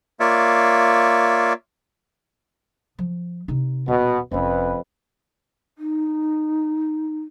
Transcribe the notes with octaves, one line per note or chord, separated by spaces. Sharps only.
A#3 F4 C#5 D5 E5
F3
C3 D#4
D#1 B2 B3
F1 F2 C#4 B4
D#4